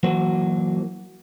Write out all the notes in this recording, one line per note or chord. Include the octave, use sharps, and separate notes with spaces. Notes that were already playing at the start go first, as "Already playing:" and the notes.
E3 F#3 A#3 F#4 C5